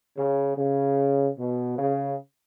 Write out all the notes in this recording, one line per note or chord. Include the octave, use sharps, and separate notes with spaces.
C#3
C#3
B2
C#3